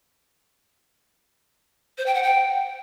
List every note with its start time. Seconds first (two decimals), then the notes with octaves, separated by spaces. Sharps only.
1.98 C5
2.06 G5
2.15 F#5
2.23 G5